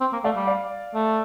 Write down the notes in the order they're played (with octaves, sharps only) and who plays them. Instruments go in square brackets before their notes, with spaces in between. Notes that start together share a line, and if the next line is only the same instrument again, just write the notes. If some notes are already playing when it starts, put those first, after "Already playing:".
[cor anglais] C4
A#3
[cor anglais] A3 [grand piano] D5 F5
[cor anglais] G3
[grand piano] D5 F5
[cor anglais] A3